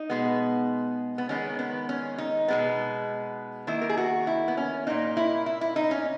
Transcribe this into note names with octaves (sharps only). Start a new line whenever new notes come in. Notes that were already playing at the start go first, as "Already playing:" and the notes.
Already playing: D#4
B2 G#3 B3
B3
D#3 G#3 B3 C#4
B3
C#4
D#4
B2 G#3 B3
D#3 A#3 E4
A#4
G#4
F#4
E4
B3
C#4
A#2 A#3 D#4
E4
E4
E4
D#4
C#4